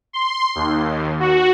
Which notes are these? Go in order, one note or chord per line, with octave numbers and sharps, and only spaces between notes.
C6
D#2
F#4